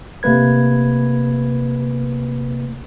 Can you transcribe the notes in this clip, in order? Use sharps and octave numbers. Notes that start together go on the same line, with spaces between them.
C3 A3 A#3 B4 G#6